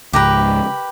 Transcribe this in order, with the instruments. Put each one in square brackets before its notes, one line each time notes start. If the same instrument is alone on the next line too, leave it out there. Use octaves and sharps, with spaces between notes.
[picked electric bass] C#2 G#2 [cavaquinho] G4 A#4 B4